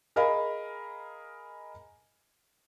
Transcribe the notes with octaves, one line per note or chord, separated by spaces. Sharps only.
G#4 A#4 D#5 F5 B5